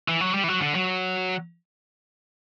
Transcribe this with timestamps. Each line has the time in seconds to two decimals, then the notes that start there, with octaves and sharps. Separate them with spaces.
0.09 E3
0.21 F#3
0.34 G3
0.44 E3
0.48 F#3
0.62 D3
0.75 F#3